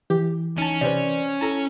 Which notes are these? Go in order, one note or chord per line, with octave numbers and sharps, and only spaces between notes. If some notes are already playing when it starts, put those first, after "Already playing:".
E3 G4
C#4 D#4 A5 D#7
C3 B4 C5 D5
E4 A4 A5 A#5